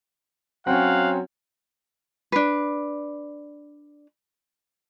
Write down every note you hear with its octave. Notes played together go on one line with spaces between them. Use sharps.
F#3 C4 C#4 F5 F#5
D4 B4